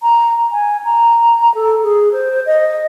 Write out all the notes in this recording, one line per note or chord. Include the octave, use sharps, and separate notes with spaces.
A#5
G#5
A#5
A4
G#4
C5
D#5